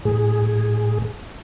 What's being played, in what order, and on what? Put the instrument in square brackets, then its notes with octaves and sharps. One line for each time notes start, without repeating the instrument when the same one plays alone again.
[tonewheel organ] A2 G#4